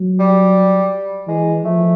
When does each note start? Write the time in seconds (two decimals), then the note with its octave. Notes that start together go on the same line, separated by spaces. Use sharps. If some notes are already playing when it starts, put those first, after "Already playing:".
Already playing: F#3
0.19 G3
1.28 E3 G#3
1.64 F3 A3